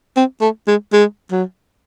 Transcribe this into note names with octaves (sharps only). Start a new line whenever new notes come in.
C4
A3
G#3
G#3
F#3